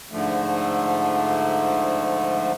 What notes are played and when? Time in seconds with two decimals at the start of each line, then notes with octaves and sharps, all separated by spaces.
0.12 G#2 D3 F3 A3